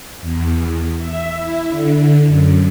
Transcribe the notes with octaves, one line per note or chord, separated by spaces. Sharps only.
E2
E5
E4
D3
F#2